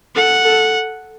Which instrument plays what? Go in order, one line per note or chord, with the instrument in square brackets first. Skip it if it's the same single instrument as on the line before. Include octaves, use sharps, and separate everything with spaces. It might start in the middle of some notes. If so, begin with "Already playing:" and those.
[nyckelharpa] A4 [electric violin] F#5
[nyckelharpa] A4